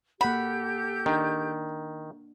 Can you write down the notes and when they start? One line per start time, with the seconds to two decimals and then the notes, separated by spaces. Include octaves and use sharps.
0.21 A#3 G4 A4 F#5 B5 G6
1.06 D#3 D4